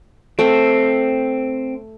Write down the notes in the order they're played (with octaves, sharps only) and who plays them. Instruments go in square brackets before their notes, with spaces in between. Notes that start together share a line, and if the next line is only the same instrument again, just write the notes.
[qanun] A3 [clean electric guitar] C4